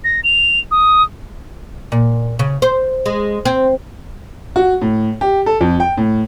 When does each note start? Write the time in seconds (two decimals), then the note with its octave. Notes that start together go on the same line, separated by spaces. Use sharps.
0.04 A#6
0.24 F7
0.71 D#6
1.92 A#2
2.39 C#3
2.62 C5
3.06 G#3
3.45 C4
4.56 F#4
4.82 A2
5.21 G4
5.46 A4
5.61 F2
5.80 G5
5.97 A2